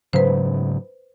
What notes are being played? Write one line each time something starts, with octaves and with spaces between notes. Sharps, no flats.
G#2 C#3 F#3 B4 C5